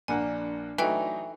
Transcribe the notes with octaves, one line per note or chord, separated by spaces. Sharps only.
A#1 A#3 D4 F#5 G#5
E3 F#3 A3 D#4 E5 G5